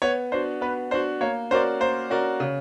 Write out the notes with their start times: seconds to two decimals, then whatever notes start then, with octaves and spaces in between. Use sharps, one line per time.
0.02 B3 C#5
0.32 D4 F#4 C5
0.61 B3 B4
0.91 D4 F#4 C5
1.21 A#3 C#5
1.51 C#4 F#4 A#4 C5 D5
1.80 A#3 C5
2.10 C#4 F#4 A#4 D5
2.40 C#3